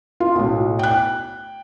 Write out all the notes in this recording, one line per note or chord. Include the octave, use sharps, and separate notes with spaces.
F4
B1 A2
G5 F#6